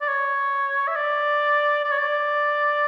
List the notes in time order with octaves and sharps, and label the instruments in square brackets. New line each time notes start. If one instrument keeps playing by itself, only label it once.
[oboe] D5
C#5
E5
D5
D5
C#5
D5